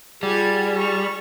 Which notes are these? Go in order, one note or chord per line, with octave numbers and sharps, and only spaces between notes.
G3 F4 G#4 F#5 G#6
C#6